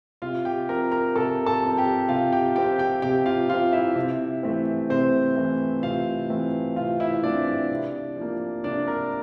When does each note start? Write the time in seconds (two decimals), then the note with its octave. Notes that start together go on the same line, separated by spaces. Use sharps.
0.22 C3 F4 F5
0.45 G4 G5
0.69 F3 C4 A#4 A#5
0.92 A#4 A#5
1.15 C3 A4 A5
1.46 A4 A5
1.63 F3 C4
1.78 G4 G5
2.09 C3 F4 F5
2.32 G4 G5
2.56 F3 C4 G4 G5
2.79 G4 G5
3.02 C3 G4 G5
3.26 F4 F5
3.49 F3 C4 F4 F5
3.73 E4 E5
3.96 C3
4.43 E3 A3 C4
4.90 C3 C4 C5
5.36 E3 A3 C4
5.83 C3 F4 F5
6.30 E3 A3 C4
6.76 C3 F4 F5
7.00 E4 E5
7.14 E5
7.23 E3 A3 C4 D4 D5
7.47 D4 D5
7.70 C3
8.17 F3 A#3
8.64 C3 D4 D5
8.88 A#4